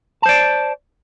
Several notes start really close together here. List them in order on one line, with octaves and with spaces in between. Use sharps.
A5 C5 D5